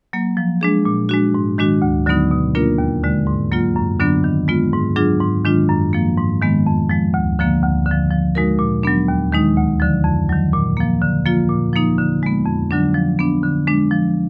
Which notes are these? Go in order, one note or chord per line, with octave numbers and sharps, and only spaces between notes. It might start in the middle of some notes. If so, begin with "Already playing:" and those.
F#3 A#3
F3
G#3 D4 G#4
A#2
G#3 D4 F#4
G#2
D#3 G#3 D4 F#4
D2
D3 F#3 B3 D#4
B2
A#3 D4 F4 A#4
D#2
D3 G#3
G#2
F#3 A#3 F4
F#2
D3 F#3 B3 D4
D#3
G#3 B3 F4
G#2
F#3 D4 F4 G#4
G#2
D#3 G#3 D4 F4
F#2
F3 A#3
G#2
D#3 G#3 B3
F2
F3 G#3
D2
D3 F3 A#3
D2
D3 F3
F3
G#3 D#4 F#4 A#4
A#2
F#3 B3 D4
D#2
D#3 G#3 D#4
D2
D3 F3
F2
D#3 F#3
A#2
F3 A#3
D3
F3 A#3 F4
A#2
F3 A#3 D#4
D3
G#3 B3
F2
D3 F#3 D4
F3
B3 D4
D3
G#3 D4
F3